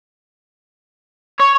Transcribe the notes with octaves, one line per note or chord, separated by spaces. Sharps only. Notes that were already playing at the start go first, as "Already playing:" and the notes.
C#5 C#6